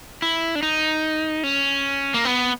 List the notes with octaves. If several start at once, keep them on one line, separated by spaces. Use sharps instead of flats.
E4
D4
D#4
C#4
A#3
B3